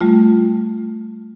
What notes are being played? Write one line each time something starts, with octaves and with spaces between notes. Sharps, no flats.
G3 A3 F4